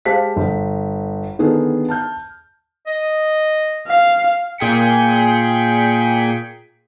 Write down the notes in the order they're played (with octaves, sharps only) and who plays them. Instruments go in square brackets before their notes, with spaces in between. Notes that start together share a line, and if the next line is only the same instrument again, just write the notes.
[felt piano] G#3 G4 C5 F5 A5 B6
G1
D3 D#3 B3 G#4 A4
A5 F6 G6
[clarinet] D#5
[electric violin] F5
[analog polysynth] A#2 G#4 G5 B6 C#7